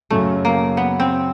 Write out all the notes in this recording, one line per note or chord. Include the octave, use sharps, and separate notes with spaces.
F#2 C#3 F#3 A3
A#3
B3
C4